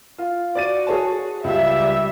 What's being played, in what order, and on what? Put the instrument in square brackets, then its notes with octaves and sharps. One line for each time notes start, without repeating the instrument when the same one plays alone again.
[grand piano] F4
[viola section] F#4 [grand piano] D5 A6 D#7
[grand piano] G#4 C#5 A5
[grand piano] C#2 [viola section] G3 E5